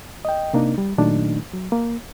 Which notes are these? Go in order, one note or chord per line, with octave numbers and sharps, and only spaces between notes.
D#5 G5
C3 A#3 D4 D#4
G3
A#2 D#3 F#3 A3 D4 D#4
F#3
A#3